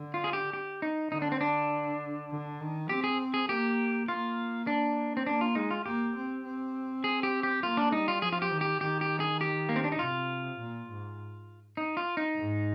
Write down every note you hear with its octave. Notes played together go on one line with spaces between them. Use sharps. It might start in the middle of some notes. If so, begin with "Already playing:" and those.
Already playing: D3
F4
G#4
G4
G4
D#4
D3 D#4
D4
C4
D4
D3
D#3
C4 G4
G#4
G#4
A#3 G4
A#3 F4
D4
C4
A#3 D4
F4
G#3 D#4
F4
A#3 G4
C4
C4
G#4
G4
G4
A#3 F4
D4
G3 D#4
F4
F3 G#4
F4
G4
D#3
G4
D#3 G4
G4
G#4
G4
A#3
C4
D4
D#4
C3 F4
A#2
G#2
D#4
F4
D#4
G#2